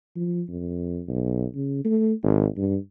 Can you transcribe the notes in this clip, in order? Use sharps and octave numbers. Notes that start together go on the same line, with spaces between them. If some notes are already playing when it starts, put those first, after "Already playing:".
F3
F2
B1
C#3
A3
G#1
G2